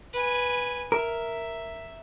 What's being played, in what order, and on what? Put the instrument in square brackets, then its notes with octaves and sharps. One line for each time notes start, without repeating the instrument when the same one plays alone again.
[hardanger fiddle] B4 G#5
[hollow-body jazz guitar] A#4 [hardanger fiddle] E5